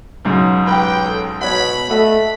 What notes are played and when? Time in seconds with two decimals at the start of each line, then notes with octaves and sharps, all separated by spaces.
0.25 B1 G#2 C#3
0.67 G4 B4 G5
1.03 C#4 A4
1.41 B2 C#5 F#5 B5
1.90 A3 A4 D#5 F#5 B5